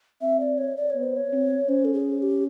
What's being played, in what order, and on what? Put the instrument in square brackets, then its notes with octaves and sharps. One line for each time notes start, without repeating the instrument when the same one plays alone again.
[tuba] C4 [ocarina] E5
[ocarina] D5
C#5
D5
C#5
[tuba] B3
[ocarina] C5
C#5
[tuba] C4
[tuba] C#4 [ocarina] C5
[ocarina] A4
G#4
G#4
G4